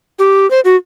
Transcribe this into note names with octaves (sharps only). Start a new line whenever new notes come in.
G4
C5
F#4